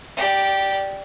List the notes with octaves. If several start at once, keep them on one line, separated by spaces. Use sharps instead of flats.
G4 D5